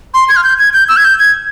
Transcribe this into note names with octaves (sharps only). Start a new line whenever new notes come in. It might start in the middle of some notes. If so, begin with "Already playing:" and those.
C6
G#6
F6
G6
G#6
G6
E6
G#6
G6
G#6